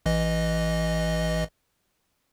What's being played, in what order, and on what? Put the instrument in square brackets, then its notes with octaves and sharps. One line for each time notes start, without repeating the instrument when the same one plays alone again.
[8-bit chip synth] A1 E3 D#5